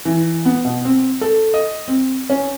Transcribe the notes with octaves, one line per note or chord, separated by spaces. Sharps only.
E3
B3
B2
C4
A4
D#5
C4
C#4